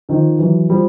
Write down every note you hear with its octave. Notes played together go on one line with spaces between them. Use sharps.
D#3 F3
E3 F#3
F3 G3